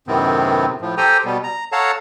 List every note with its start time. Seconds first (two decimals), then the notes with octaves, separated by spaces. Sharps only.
0.07 F#2 A2 C3 D#3 B3 C4
0.81 A2 F3
0.98 G4 A4 C5 G5 G#5 A#5
1.25 B2 G3 B3
1.43 A#5
1.72 A4 C#5 F5 F#5 A5 A#5